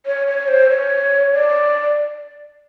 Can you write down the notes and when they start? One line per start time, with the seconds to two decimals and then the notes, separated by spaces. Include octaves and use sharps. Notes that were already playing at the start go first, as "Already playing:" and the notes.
0.06 C#5
0.27 C#5
0.48 C5
0.70 C#5
1.33 D5